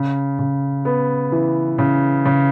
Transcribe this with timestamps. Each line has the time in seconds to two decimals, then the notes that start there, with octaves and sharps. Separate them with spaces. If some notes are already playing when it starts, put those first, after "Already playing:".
Already playing: C#3
0.39 C#3
0.85 B3
1.32 E3
1.78 C#3
2.25 C#3